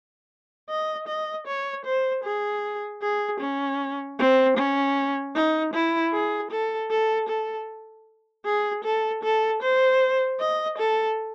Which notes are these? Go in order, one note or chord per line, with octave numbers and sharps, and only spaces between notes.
D#5
D#5
C#5
C5
G#4
G#4
C#4
C4
C#4
D#4
E4
G#4
A4
A4
A4
G#4
A4
A4
C5
D#5
A4